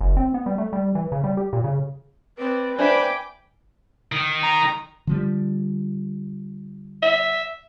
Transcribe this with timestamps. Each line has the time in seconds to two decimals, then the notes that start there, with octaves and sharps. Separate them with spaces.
0.01 F#1
0.17 C4
0.34 B3
0.46 G3
0.58 A3
0.73 G3
0.95 E3
1.12 C#3
1.24 G3
1.37 G4
1.53 A#2
1.64 C#3
2.38 C4 B4 D5
2.79 D4 C5 E5 G5 G#5 B5 D6
4.12 D#3
4.43 A#5
5.07 D3 F3 G3
7.02 E5